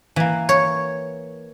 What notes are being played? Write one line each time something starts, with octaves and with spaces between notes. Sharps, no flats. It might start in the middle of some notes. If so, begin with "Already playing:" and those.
E3 A#3
C#5